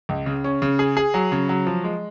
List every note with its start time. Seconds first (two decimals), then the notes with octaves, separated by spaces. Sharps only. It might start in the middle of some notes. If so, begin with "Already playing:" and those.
0.09 C#2
0.26 C#3
0.44 C#4
0.62 C#3
0.79 G#4
0.97 G#4
1.14 F#3
1.32 C#3
1.49 F#3
1.66 F3
1.84 G#3